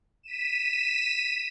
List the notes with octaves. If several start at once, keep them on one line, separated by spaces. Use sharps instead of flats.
B6 D#7 E7